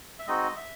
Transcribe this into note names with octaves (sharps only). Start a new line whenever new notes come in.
E5
G#3 C4 D#4 F#4 D#5
E5